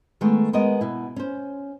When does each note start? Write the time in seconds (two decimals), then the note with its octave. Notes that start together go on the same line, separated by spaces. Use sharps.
0.21 D#3 G#3 A3 B3 G5
0.53 G#3 B3 A#4 D#5
0.81 B2 E4
1.16 C#4 C5